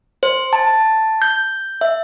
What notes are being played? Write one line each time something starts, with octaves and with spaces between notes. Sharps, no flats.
C5
A5
G6
E5